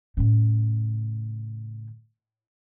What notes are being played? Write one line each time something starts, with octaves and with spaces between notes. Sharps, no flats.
A2 C#3